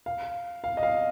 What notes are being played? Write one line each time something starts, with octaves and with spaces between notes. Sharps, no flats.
F5
F5
D#5
F5